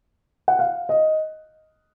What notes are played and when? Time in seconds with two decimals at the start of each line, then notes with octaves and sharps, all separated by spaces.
0.48 F#5
0.59 F5
0.89 D#5